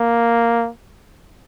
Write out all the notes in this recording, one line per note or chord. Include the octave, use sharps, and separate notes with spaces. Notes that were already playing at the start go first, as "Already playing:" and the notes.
Already playing: A#3